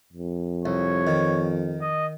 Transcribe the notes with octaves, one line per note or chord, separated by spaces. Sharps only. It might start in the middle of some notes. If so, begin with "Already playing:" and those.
F2
C2 C#5
D#3
D#5